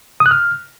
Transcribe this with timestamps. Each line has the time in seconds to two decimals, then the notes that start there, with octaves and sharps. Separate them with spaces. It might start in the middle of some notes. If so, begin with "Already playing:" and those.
0.20 D#6
0.26 F#6
0.31 F6